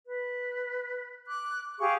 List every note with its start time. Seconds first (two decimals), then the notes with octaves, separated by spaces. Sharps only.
0.06 B4
1.28 D6 F#6
1.79 G4 G#4 F5 C#6